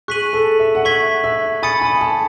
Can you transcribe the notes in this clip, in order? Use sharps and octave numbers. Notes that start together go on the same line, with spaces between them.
G#4 C#6 F#6 B6 D#7 F#7
A4
E5
F#5
E5 C#6 G#6 B6 F#7
E5
G#5 B5 D#6 A6 C#7
B5
A5